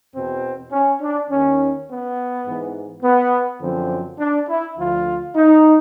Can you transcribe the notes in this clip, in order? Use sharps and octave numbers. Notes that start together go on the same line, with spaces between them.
E2 B2 C4
C#4
D4
D#2 D#3 C#4
B3
G#2 E3
B3
F#2 D3 F3 C4
D4
E4
D2 D3 F3 F4
D#4